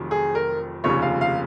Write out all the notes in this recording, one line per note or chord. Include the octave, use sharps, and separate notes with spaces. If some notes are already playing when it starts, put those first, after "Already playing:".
Already playing: F1 F2 D#3 F#3
G#4
A#4
F1 D#2 C#3 F3 C#5
F5
F5